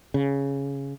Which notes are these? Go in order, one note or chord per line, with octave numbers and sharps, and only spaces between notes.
C#3